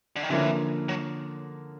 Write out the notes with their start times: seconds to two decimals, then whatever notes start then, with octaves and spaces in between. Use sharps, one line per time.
0.16 D3
0.23 D#3
0.30 D3 E3 F3 A#3 C#4
0.89 F#3